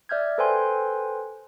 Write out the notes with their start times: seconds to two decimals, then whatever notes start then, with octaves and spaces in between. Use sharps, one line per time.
0.09 D5 E5 F6 G6 G#6
0.38 A4 B4 C5 G5 G#5 C6